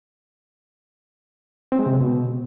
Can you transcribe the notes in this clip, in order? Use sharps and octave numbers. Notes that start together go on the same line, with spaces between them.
C4
G#3
C3
C#3
B2